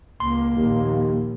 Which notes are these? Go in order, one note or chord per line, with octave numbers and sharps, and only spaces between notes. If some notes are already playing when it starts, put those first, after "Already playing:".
C#2 A#3 C6
A#1 D#2